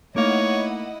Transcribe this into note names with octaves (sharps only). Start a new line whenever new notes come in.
A3 A#3 D#4 E4 C#5 D#5 F5 F#5